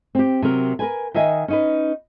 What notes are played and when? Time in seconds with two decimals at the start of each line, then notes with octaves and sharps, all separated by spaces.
0.15 C4 G4
0.42 C3 F#3 A#4
0.79 A#4 B4 G#5
1.14 D#3 D#5 E5 G#5
1.48 C#4 D#4 B4